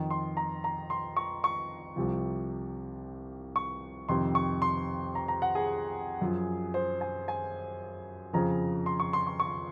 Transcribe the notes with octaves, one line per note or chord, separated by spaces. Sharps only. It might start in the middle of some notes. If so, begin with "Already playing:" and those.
Already playing: F2 D#3
C6
A#5
A#5
C6
C#6
C#6
C2 C3 F3
C#6
F2 C3 D#3 C6
C#6
C6
A#5
A#5
F#5
G#4
F#2 F3
C5
G#5
G#5
F2 C#3 F3 A#5
C6
C#6
C6
C#6
C#6